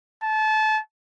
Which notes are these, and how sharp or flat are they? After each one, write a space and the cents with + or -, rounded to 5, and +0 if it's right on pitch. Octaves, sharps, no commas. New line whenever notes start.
A5 -25